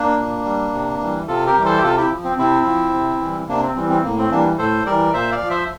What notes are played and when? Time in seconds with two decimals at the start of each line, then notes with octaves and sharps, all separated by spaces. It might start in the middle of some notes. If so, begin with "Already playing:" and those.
Already playing: A#3 D4
0.18 A#2
0.45 G3
0.73 C3
1.01 E3 G3
1.28 C3 F4 A4
1.46 G4 A#4
1.56 E3 G3
1.65 A4 C5
1.78 G4
1.83 C3 F4 A4
1.97 E4 G4
2.10 F3
2.24 C4
2.38 C3 C4 E4
2.66 F3
2.93 C3
3.21 E3 G3
3.48 C3 A#3 D4
3.62 C4
3.76 E3 G3 C4
3.90 C4
4.03 A2 A#3
4.18 C4
4.31 E3 G3 A#3 D4
4.58 A2 A4 C5
4.86 E3 G3 A#4 D5
5.13 A#2 C5 E5
5.32 D5 F5
5.41 F3
5.50 C5 E5